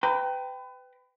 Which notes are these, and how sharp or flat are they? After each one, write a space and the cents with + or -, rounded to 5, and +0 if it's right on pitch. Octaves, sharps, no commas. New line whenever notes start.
B4 +30 G5 +0 A#5 +0